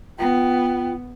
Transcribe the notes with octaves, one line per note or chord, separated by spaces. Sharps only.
B3 F4 G5